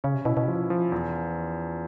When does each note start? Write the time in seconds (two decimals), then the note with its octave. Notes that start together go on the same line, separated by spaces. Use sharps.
0.04 C#3 C#4
0.14 C3
0.25 B2 E4
0.37 B2
0.46 C3 F3
0.55 B2
0.70 F3
0.92 E2